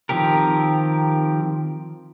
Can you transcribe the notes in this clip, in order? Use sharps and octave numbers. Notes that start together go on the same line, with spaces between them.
D#3 F3 C4 G4 A#4